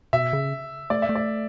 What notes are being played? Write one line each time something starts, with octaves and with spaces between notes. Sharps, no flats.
B2 E5
C#3
A3 D5
E5
A3
D5